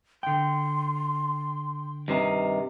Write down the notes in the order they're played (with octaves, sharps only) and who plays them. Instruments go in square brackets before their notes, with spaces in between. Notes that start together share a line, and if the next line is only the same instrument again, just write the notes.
[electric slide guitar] D3 G5 [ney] C6
[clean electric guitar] G2 C3 D#3